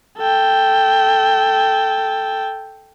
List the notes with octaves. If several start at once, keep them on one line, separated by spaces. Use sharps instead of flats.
A4 G5